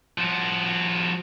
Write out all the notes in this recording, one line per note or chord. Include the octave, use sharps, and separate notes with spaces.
F3 F#4